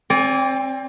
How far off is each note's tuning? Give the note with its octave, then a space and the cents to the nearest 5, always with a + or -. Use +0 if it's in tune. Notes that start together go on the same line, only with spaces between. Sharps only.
C4 +20 D5 -25 G#5 -15